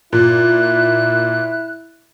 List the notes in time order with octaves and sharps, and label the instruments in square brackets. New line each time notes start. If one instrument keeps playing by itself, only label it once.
[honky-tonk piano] A#2 [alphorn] E4 [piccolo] F#6